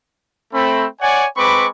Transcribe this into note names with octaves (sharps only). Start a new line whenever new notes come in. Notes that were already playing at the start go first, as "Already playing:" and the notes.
A3 C4 B5
C#5 D5 F#5 G#5
G#3 C4 B4 B5 C#6 D6